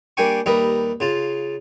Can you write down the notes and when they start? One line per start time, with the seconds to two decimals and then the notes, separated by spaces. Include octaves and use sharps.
0.17 G3 A#3 D4 G5 G#5 C#6
0.46 D#2 G3 A#4 B4 D#5 E5
1.00 C#3 F4 A5